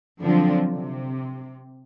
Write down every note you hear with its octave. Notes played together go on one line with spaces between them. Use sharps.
D3 F3 F#3 C4 D4
C3